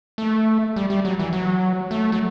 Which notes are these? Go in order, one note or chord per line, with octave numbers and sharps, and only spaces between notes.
A3
G3
G3
F#3
E3
F#3
A3
F#3